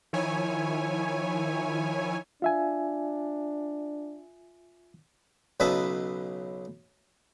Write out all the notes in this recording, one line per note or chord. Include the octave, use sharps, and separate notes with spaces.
D#3 F3 E4 C#5 G#5
D4 F4 E5 G#5
B1 C#3 B4 D#5 E5 A5